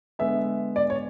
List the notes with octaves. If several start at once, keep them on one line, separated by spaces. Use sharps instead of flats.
D3 G#3 B3 E5
D5
C#5